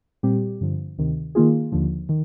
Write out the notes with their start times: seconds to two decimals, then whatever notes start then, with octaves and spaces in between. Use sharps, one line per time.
0.23 A#2 G3 C4 G4
0.61 G2 D3 F3
0.98 D2 C3 D#3
1.35 D#3 A#3 F4 G#4
1.72 D#2 D3 F3
2.09 D#3